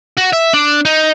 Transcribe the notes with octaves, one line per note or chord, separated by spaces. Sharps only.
F#4
E5
D4
D#4